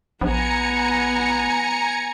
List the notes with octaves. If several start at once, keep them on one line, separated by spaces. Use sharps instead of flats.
A#1 B3 G#5 A#5 C#7